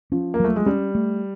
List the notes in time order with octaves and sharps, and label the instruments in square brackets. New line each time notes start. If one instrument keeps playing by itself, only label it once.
[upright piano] F3 [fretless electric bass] C#4
[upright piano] A#3
[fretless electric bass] F#3 [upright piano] A3
[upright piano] G#3
[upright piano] G3 [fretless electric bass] C#4
[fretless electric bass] A3